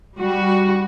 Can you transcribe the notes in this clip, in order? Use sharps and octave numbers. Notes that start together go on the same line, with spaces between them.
G3 F#4